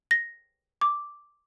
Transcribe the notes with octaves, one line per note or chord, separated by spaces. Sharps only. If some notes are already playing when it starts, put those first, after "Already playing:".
A#6
D6